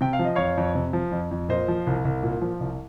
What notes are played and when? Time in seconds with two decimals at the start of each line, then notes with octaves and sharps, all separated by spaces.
0.01 C3 G5
0.13 F5
0.19 F3
0.24 D#5
0.35 F2 C#5 F5
0.57 F2
0.75 C3
0.93 F3
1.12 F2
1.31 F2
1.49 A#2 C5 D#5
1.68 F3
1.87 C2
2.05 C2
2.23 A#2
2.41 F3
2.60 C2